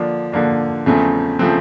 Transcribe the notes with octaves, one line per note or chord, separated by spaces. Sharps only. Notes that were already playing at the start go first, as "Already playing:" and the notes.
Already playing: D3 F3 A#3 D4
D3 F3 A#3 D4
E2 C#3 F3 A3 C4
C#3 F3 A3 C4